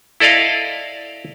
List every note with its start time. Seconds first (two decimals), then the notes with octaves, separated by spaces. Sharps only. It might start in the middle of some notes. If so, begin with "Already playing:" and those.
0.20 E4 A4 D5 D#5 F5